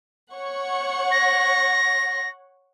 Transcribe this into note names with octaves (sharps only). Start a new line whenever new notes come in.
C#5 F#5 C#6
A#6